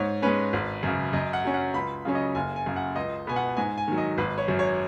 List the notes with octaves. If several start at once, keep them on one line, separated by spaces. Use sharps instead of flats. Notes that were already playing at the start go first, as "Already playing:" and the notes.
Already playing: G#2 C#5
G#3 C#4 B4
G#1
F#2 C#3
F#2 D#5
F#5
F#3 C#4
F#5
C#2 B5
C#3 F#3 C#4
D#5
F#1 G#5
G#5
F#2 C#3
F#5
C#2 D#5
B2 B3 G#5
F#5
G#2 G#5
G#5
D#3 F#3
D#5
G#1 B4
C#5
F#2 F#3
C#5